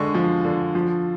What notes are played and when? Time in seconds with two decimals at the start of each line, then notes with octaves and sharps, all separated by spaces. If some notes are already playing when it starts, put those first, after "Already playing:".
Already playing: D3 G#3 C#6
0.14 F3
0.45 D3
0.75 F3